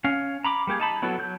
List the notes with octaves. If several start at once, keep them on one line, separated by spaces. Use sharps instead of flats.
C#4 F5
A#5 B5 D6
G3 A#3 G4 G#4
D#4 A5 B5
F#3 B3 E4 F#4 A4
F#3 G6